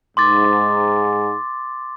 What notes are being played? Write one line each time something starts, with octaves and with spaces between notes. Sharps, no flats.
G#2 C6 D6 A6